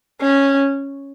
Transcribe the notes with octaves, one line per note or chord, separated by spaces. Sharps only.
C#4